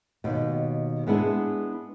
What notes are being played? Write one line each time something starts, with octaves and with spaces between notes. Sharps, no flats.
D#2 B2
G#3 B3 D4 E4 G#4